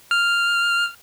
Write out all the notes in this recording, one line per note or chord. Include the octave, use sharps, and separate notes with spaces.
F6